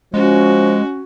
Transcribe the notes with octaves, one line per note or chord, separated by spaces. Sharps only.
F3 G#3 C#4 F#4